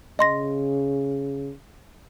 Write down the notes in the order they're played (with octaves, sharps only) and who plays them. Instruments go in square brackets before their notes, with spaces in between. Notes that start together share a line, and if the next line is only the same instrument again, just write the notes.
[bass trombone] C#3 [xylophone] D#5 C6 A#6